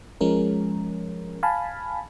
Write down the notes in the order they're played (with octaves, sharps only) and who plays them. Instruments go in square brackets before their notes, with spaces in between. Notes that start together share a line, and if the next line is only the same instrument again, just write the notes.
[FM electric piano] F3 G#3 C#4 A#4
F5 G#5 A5 B5